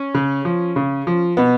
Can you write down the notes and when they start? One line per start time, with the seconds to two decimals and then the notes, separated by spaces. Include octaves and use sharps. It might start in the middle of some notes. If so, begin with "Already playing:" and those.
Already playing: C#4
0.14 C#3
0.45 F3
0.76 C#3
1.07 F3
1.37 B2 B3